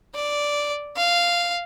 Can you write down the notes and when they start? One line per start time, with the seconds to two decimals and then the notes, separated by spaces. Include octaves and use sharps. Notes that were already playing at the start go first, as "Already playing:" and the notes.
0.15 D5
0.96 F5